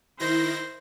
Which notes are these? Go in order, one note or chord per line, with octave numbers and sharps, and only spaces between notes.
D#3 E4 C5 A#6